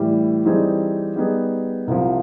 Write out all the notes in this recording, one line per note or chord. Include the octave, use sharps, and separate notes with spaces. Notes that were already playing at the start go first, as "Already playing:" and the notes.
Already playing: A2 E3 G3
E3 G3 C4 D#4 G#4
G3 B3 D#4 G#4
C2 C3 F3